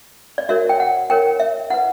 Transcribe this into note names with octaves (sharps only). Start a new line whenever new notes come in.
D5
F#4 A#4 C#5 E5
G5
F#5
E4 A#4 C#5 G5
E5
E4 B4 F#5